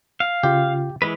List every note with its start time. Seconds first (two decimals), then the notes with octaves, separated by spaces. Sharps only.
0.20 F5
0.43 C#3 F4 G4
1.02 E3 G#3 B4